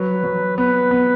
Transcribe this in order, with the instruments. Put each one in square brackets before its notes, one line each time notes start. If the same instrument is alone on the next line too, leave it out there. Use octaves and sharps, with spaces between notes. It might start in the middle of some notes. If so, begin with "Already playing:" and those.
Already playing: [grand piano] F#3 [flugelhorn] B4
[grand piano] F#3
[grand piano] B3 [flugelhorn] B4
[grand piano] B3